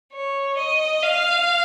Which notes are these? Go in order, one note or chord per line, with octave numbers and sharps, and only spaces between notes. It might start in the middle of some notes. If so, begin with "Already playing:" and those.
C#5
D#5
F5